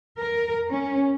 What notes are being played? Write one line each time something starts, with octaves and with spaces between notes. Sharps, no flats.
A#4
C#4